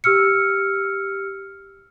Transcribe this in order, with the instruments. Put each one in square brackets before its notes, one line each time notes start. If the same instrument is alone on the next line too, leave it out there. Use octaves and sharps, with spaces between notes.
[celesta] G4 E6 F6 C#7